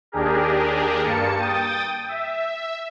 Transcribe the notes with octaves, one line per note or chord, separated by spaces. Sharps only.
D#2 D4 G4 G#4 A#4
G2 A#3 A5 C#7
G5 D#6 A6
E5